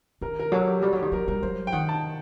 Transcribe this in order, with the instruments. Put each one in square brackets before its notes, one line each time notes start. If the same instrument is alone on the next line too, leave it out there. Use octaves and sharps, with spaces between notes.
[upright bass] D#3 [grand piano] A#4
[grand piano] A#4
[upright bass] F#3 [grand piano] A4
[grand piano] G4
[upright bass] G3 [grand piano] F#4
[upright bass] F#3 [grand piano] G4
[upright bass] D#3
[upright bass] F#3 [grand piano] A#4
[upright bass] G3 [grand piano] A#4
[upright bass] F#3 [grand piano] C5
[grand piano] G5
[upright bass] D#3 [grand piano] F#5
[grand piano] A5